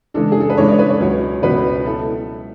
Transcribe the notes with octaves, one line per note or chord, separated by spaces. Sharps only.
C#3 E3 G#3 D4 A4
G#4
A4
B4
C#3 E3 G#3 D4 C#5
D5
B4
C#5
C#2 B2 F#3 B3
C#2 B2 F#3 B3 B4
E4 A4